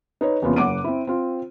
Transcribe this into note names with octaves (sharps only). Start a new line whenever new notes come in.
D#4 B4 C#5
E2 C3 A#3 B3 C#4 F4
F#1 F#5 D6 D7 D#7
C4 E4
C4 F4